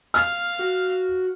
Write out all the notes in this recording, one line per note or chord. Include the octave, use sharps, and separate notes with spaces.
F5 F6
F#4